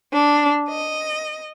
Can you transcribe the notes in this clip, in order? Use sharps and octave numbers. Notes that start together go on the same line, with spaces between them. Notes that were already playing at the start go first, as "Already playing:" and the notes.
D4
D#5